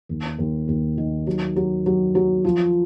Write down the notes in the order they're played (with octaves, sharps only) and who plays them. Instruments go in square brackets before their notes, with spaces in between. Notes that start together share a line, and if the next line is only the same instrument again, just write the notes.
[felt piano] D#2
D#2
D#2
D#3
F#3
F#3
F#3
F#3
F3